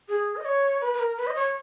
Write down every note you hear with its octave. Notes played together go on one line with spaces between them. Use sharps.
G#4
D#5
C#5
B4
B4
A#4
B4
D#5
C#5